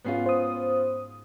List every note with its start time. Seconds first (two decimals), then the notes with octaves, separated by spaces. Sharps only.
0.05 G#2 B3 C#4 F4 F#4 C7
0.26 C5 D#6